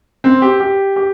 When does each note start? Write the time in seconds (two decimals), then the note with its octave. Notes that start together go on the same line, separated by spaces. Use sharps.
0.24 C4
0.42 G4
0.60 G4
0.96 G4